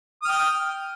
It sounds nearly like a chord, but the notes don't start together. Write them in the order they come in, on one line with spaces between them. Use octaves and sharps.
D#6 F6 G5